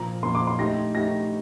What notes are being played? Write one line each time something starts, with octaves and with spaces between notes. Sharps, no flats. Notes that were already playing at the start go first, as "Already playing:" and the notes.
Already playing: A#2 F3 A#3 A#5
A#2 F3 A#3 C6
D6
C6
A3 D#4 G4 A#6
A3 D#4 G4 A#6